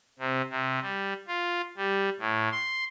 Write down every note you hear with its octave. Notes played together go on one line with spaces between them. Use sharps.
C3
C3
G3
F4
G3
A2
C6